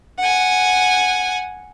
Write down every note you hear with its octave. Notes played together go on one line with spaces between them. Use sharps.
F#5 G#5